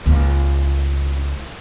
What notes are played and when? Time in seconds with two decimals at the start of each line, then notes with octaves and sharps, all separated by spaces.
0.06 C#2 A#3